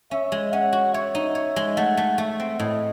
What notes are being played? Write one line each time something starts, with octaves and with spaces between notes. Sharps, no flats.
C#4 E5
G#3
C#4 F#5
F#4
C#5 E5
D#4
C#5
G#3
A3 F#5
A3
A3 E5
C4
A2 D#5